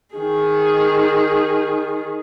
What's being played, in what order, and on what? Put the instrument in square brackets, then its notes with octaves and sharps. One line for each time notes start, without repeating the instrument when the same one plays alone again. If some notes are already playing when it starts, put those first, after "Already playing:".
[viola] D#3 G#4